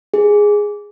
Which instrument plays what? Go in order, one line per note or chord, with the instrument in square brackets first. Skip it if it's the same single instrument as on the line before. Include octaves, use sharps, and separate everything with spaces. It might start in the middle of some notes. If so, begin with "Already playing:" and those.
[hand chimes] G#4